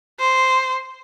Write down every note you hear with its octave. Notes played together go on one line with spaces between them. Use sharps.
C5